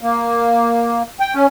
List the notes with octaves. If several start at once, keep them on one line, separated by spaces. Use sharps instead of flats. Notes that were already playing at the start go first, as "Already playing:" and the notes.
A#3
G5
C#4